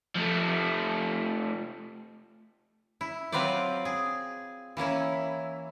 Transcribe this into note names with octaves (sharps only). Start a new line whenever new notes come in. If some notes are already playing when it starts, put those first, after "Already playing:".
F3 A3
E4
F#3 C4 F4 B4 C5 D5
G#4
E3 A#3 C#4 E4